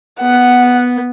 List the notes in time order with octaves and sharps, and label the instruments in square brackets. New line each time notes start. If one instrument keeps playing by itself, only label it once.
[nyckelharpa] B3 [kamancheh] F#5